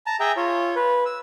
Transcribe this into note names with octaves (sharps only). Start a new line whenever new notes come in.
A5 A#5
G#4 E5 G5 A#5
F4 C#5
B4
E6